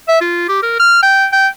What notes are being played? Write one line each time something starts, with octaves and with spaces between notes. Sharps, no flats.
E5
F4
G4
A#4
F6
G5
G5